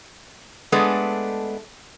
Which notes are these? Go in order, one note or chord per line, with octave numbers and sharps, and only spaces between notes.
G#3 A3 B3 D4 G#4 A4